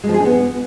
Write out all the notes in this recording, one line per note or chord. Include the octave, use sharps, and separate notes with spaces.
G#3
F3
G#4
D4
B3